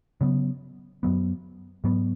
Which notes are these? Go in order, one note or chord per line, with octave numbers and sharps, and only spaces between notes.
C#3 F#3 B3
F#2 F#3 B3
G#2 F#3 B3